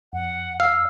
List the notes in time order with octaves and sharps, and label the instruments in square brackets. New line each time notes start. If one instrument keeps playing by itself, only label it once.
[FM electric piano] F2 [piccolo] F#5
[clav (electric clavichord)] F5 [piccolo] E6